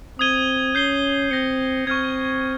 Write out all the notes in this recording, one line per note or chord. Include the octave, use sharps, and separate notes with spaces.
C4 D#6 G#6 D#7 G7
C#4 G6 C7 G7
C4 G6 A#6 C#7
C4 C#6 F6 G#6